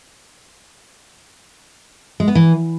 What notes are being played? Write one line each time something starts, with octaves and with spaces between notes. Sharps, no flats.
G#3
B3
E3